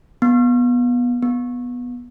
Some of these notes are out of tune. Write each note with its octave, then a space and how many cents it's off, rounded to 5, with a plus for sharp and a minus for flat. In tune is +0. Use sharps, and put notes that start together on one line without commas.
B3 -15
B3 -5